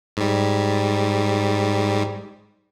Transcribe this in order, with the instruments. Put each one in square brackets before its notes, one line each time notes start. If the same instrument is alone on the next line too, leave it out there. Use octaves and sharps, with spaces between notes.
[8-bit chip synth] G#2 G3